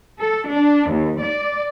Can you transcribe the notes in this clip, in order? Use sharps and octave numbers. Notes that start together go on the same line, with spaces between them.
A4
D4
D#2
D5